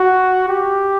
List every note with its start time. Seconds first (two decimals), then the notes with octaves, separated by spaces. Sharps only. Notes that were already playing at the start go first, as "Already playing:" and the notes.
Already playing: F#4
0.48 G4